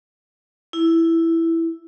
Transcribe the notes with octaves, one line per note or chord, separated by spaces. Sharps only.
E4